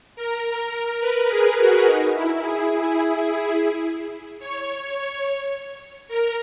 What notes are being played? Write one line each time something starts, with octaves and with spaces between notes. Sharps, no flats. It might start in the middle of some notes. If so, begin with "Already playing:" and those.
A#4
B4
G#4
F#4
D#4
E4
G#4
C#5
A#4